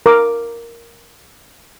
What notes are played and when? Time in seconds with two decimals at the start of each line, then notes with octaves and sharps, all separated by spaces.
0.06 A#4 D6